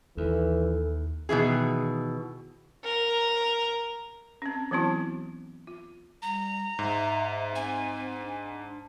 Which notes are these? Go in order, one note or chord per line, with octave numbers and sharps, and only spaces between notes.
D#2 E3 A4
B2 D#3 E3 G#4
A#4
C4 C#4
E3 F#3 B3 C4 E4 F#4
F4
G3 A#5
G#2 E5
C4 G#5
D4